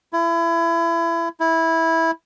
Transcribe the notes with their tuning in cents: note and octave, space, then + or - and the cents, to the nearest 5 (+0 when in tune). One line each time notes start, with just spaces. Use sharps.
E4 +30
E4 -10